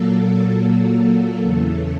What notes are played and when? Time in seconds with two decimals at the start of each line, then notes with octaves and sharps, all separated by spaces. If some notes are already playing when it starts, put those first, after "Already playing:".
Already playing: A#2 F#3 A#3 A4
0.64 A4
1.42 E2 C#3 E3